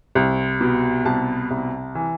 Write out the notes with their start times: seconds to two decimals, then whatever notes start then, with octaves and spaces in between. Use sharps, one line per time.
0.15 C2
0.61 B2
1.05 C2 A5
1.51 C2
1.95 E3